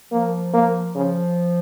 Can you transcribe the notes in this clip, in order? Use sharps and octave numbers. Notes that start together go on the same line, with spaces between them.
F3 A#3
A#3
C#3 F3